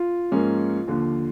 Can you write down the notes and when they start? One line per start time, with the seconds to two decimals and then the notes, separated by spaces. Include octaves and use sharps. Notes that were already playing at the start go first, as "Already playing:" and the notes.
Already playing: F4
0.31 G#2 F3 A#3 C#4
0.87 D#2 D3 F3